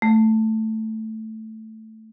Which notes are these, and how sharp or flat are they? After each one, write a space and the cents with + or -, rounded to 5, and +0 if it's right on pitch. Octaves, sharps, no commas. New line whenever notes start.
A3 +0